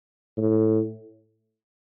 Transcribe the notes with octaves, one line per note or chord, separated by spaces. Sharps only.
A2